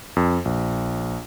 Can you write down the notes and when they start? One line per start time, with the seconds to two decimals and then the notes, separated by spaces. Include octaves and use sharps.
0.16 F2
0.45 A#1